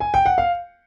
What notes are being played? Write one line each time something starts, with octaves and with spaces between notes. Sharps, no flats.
G#5
G5
F#5
F5